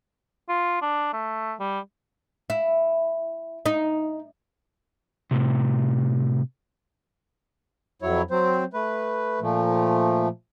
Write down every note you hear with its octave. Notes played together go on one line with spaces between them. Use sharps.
F4
D4
A3
G3
E4
D#4
A2 C3
F2 F#3 E4 C#5
F#3 C4 C5
A3 B4
A#2 F3 A3